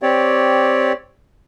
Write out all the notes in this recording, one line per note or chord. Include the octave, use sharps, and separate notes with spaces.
C4 G4 C#5 D5